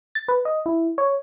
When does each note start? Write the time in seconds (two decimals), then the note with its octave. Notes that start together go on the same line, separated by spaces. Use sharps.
0.15 A6
0.28 B4
0.45 D#5
0.66 E4
0.98 C#5